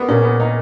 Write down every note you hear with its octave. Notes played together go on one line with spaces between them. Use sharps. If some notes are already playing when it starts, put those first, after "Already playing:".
Already playing: A#3 B3
A#2 C#4
B3
A#3 D#4